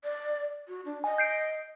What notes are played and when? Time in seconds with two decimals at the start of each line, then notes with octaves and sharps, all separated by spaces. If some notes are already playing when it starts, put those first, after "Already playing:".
0.04 D5
0.68 F#4
0.85 D4
1.04 D#5 G#5
1.18 G6 C7 D7